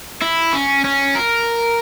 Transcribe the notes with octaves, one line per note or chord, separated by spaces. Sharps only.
E4
C#4
C#4
A#4